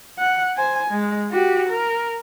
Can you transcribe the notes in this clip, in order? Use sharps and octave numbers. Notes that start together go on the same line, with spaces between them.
F#5
C5 G#5
G#3
F#4 G4
A#4